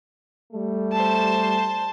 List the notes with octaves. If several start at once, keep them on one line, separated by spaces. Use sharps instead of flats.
G3 A3
C5 A5